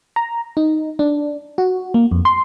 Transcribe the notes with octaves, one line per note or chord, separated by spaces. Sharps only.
A#5
D#4
D4
F#4
A#3
F2
C6